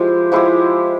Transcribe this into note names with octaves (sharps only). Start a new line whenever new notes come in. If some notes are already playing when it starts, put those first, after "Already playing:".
Already playing: F3 G#3 E4 G4
F3 G#3 E4 G4